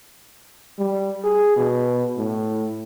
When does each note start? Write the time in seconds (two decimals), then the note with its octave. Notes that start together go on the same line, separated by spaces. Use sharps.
0.79 G3
1.24 G#4
1.57 B2
2.18 A2